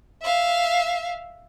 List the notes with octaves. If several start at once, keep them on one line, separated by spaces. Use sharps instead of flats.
E5 F5